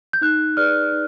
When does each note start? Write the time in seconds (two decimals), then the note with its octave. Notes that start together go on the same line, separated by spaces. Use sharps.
0.13 G6
0.21 D#4 F#6
0.57 G#4 B4 D5 F6
0.92 D#4